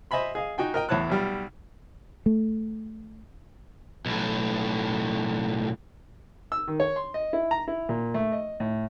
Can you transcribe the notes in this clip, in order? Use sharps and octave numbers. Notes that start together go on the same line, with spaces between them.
C5 D#5 E5 G#5 B5 C6
G#4 D#5 F5
D#4 F#4 G5 G#5
A#4 D#5 G5
E2 A2 C#5 A5 F#6
B1 G3 F6
A3
B1 A2
E6
D#3
C#5
C6
D#5
E4
A#5
E4
A#2
A3
D#5
A2